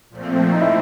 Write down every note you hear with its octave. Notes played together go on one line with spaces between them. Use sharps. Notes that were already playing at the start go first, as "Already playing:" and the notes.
A#2 F3 A3 C4
D#4
E4